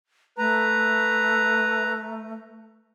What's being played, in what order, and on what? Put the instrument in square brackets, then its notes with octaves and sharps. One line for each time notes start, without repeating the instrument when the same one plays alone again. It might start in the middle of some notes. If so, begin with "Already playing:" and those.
[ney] A3 [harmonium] B4 A#5